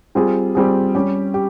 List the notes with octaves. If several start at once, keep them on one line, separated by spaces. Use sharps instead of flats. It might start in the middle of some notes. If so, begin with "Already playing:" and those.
G3 C4 F4 G#4
G3 C4 F4 G#4
G3 C#4 G4
G4